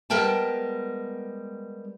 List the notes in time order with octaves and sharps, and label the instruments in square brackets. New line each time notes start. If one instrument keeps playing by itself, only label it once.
[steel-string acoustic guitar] G3 G#3 B3 A#4 G5 A5